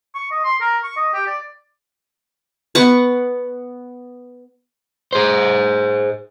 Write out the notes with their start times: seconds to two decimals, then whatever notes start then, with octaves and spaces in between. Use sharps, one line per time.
0.15 C#6
0.32 D#5
0.44 C6
0.61 A#4
0.83 C#6
0.97 D#5
1.13 G4
1.27 D5
2.75 B3 F#5 C#6
5.13 G#4 C5